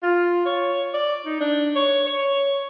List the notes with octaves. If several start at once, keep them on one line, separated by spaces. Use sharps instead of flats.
F4
C#5
D5
D#4
D4
C#5
C#5